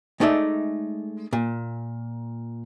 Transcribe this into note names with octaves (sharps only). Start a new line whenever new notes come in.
G#3 A3 D#4 D5 E5
A#2